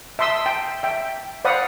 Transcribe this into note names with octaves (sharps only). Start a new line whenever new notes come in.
E5 A5 C6 D#6 E6
G5
E5 G5
C5 D5 F5 F#5 B5 D#6